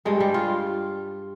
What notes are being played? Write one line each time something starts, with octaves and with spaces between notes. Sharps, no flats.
G2 G3 G#3
G3
F4